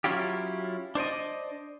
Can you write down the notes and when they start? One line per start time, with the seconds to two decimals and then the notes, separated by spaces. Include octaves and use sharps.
0.04 F#3 C#4 E4 F4 G4
0.95 D4 C5 D5 D#5